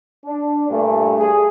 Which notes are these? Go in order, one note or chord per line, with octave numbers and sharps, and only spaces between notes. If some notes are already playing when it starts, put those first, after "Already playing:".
D4
G2 A#2 A3
G#4